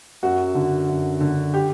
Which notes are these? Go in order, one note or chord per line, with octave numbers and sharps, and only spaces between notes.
F#2 F#4
D3
F#2
D3
G4